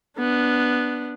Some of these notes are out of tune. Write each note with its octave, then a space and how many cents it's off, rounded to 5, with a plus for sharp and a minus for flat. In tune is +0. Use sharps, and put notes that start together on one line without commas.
B3 -5 D4 +0